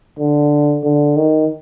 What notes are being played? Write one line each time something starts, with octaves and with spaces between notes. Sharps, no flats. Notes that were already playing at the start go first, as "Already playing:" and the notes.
D3
D3
D#3